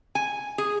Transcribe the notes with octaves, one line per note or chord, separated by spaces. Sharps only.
G#5
G#4